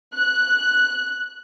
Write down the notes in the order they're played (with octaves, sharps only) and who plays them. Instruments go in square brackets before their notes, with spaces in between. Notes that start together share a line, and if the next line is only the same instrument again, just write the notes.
[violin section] F#6